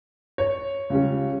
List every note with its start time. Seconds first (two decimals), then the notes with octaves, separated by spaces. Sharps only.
0.38 C#5
0.90 C#2 C#3 G3 C#4